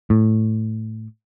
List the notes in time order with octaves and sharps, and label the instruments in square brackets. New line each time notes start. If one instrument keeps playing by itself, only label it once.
[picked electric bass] A2